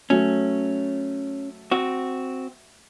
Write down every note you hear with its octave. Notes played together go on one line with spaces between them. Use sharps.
F#3 A3 C#4
C4 F#4